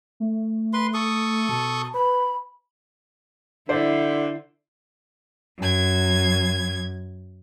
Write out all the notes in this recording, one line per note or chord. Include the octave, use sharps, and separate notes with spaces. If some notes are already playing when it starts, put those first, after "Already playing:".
A3
B4 C6
A4 C#6 D#6
B2 A5
B4 B5
D3 E4 C5 D5
F#2 G#6